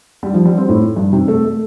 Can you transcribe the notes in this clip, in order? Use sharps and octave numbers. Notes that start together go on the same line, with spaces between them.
G3
F3
G3
C4
A2
G2
C3
A3
A3